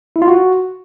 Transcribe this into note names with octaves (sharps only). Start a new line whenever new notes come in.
E4
F4
F#4